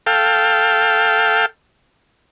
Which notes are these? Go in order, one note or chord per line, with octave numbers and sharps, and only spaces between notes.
A4 F5 G5